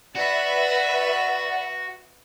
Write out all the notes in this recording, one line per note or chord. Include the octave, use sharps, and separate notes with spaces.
F#4 B4 D5 E5 F#5